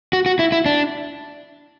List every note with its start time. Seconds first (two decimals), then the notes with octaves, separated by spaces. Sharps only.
0.13 F#4
0.26 F#4
0.39 E4
0.52 E4
0.66 D4